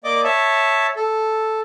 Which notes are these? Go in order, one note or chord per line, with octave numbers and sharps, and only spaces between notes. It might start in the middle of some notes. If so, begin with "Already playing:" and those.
A#3 D5 D#5 D6
C#5 E5 A5
A4